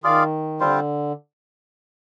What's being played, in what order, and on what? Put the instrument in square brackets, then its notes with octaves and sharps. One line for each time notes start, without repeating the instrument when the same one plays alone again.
[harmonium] D#3 [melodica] F4 G#4 D5 F5
[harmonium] D3 [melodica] G3 C4 F4 C5